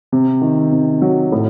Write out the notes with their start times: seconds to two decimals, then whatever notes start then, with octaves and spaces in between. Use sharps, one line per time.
0.12 C3
0.41 D#3
0.72 C3
1.02 F#3
1.32 A2